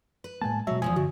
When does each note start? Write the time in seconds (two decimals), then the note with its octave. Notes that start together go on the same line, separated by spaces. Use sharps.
0.24 B4
0.42 A2 G#3 A#3 G#5 A5
0.67 B2 F#3 G#3 F#4 E5
0.82 E2 G2 F3 G#5 D#6
0.96 G2 D3 F#4